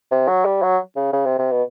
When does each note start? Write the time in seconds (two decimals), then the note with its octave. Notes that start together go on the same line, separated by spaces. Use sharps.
0.11 C3
0.28 F#3
0.45 G3
0.63 F#3
0.96 C#3
1.13 C#3
1.26 C3
1.39 C3
1.52 B2